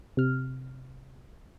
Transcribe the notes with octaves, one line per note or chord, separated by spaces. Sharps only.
C3 F6